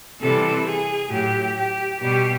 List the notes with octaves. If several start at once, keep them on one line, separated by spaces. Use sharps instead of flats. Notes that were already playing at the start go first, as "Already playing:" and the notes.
C3 E3 G3 A4
G#4
A2 F#3 G4
G4
B2 G3 G4